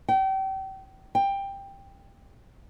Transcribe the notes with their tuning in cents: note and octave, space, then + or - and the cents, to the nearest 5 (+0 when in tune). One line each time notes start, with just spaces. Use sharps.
G5 -35
G5 +15